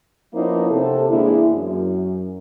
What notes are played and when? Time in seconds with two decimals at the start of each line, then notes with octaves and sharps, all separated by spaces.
0.35 F3 A#3 B3 C#4 D#4 E4
0.71 C3 A4
1.09 E2 D3 G#3 A#3 E4
1.53 F#2